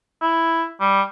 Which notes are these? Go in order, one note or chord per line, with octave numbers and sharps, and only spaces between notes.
E4
G3